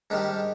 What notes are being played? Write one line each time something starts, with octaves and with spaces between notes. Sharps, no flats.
G#2 D#3 G3 D4